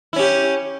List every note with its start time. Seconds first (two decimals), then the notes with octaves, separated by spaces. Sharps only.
0.13 E4
0.16 C#4
0.19 G4